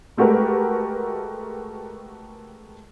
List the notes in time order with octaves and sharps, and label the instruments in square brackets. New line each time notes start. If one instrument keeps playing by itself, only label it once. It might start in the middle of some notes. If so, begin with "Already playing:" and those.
[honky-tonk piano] G#3 A3 F#4 G4 A#4 B4